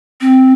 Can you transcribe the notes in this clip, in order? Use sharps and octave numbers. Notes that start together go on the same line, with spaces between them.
C4